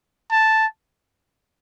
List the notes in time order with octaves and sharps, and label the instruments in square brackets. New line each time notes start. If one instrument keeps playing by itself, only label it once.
[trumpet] A5